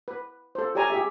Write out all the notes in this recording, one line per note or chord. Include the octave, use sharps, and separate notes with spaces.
B4
A4 C5
G4 C#5 D5 G#5 A#5
G4 G#4 E5